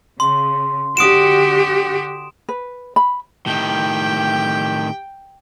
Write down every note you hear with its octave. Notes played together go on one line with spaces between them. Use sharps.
C#3 C6
D3 F#4 G4 D#6 D7 E7
B4
B5
A2 D#3 G4 G5